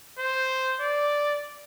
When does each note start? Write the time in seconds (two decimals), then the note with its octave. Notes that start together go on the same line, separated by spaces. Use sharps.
0.19 C5
0.81 D5